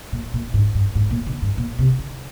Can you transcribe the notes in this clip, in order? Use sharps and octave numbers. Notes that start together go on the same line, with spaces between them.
A#2
A#2
G#2
G2
G#2
A#2
D3
G2
A#2
C3
D3